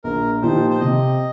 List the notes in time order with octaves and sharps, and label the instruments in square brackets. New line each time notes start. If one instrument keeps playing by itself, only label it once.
[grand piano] A#1 [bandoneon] A#4
[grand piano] A#2 F3 D#4 G4 [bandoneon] C5
[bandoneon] C5
[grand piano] C3 [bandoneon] D#5